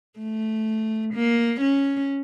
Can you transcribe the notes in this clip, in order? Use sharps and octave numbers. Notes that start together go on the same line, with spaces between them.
A3
A#3
C#4